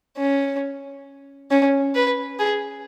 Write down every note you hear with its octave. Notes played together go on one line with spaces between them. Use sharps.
C#4
C#4
B4
G#4